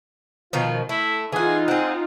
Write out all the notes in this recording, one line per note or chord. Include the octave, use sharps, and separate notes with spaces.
B2 D#3 F3 F4
A3 E4
E3 D#4 F4 G#4 F#5
C4 G#4 F#5